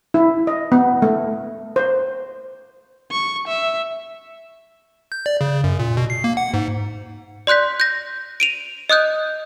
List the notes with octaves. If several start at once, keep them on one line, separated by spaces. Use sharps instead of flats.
E4
D#5
B3
A3
C5
C#6
E5
G6
D5
C#3
F#2
A#2
B2
C7
A#3
F#5
G#2
D5 C6 F#6 G6 B6
G6 A#6
D7 D#7 F7
D#5 D#6 F#6 G6